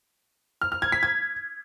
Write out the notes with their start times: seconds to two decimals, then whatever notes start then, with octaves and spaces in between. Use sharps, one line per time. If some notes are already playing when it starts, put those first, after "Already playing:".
0.61 F6
0.72 F6
0.82 G#6
0.92 B6
1.03 G#6